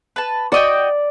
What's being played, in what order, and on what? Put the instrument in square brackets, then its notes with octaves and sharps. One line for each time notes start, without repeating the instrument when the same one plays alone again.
[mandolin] B4 A5
[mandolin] F#4 D#5 G5 [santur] D5